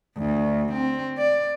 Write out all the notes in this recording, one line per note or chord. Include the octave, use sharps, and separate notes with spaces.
D2
C4
D5